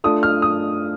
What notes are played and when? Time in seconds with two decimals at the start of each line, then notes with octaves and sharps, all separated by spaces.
0.04 A3 D4 F4 A4 D#6
0.23 F6
0.42 D#6